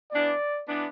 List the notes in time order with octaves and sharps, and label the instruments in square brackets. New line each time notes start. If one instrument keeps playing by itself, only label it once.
[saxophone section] E3 B3 D4 [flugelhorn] D5
[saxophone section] E3 B3 D4